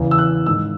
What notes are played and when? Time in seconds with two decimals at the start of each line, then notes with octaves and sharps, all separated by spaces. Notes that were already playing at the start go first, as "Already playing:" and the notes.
Already playing: E2 C#3 E3
0.11 E6
0.18 F#6
0.46 G#2 D#3 E6